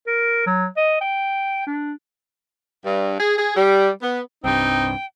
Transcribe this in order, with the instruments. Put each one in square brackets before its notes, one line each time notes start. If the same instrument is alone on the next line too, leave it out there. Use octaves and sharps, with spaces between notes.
[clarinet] A#4
F#3
D#5
G5
D4
[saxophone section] G2
G#4
G#4
G3
B3
[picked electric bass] C2 G2 [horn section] C4 [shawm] D#4 [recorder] G5